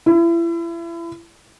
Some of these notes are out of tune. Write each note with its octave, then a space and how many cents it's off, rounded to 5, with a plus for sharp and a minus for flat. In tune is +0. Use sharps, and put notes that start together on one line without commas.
E4 +35